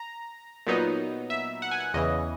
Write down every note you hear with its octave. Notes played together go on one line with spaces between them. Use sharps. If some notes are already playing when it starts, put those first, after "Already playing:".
Already playing: A#5
A#2 F#3 B3 D#4
E5
F#5
G#5
F#5
E2 C#3 E3 D#5